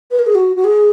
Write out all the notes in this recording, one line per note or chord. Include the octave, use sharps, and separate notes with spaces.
B4
A#4
G#4
F#4
F#4
G#4